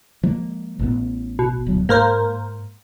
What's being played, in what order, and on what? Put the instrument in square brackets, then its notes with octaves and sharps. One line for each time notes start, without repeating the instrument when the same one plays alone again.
[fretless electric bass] F3 G#3 A#3
A1 A2 B3
[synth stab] B2
[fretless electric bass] D1 F#3
[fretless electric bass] G#2 [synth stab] A#3 A#4 C5